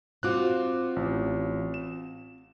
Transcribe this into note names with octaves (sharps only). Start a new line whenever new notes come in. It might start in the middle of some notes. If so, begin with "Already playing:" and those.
C4 F4 F#4 C5 D6 F#6
A1
E7